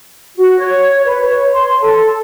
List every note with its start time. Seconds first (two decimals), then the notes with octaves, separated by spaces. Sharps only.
0.37 F#4
0.59 C#5
1.05 B4
1.22 C#5
1.53 C6
1.82 A4